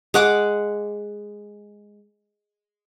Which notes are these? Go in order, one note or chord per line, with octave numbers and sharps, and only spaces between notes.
G#3 F#5 D6